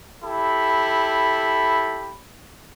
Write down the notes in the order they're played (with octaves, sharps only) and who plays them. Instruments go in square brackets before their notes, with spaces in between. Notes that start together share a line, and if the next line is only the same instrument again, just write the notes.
[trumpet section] E4 G4 A4 B5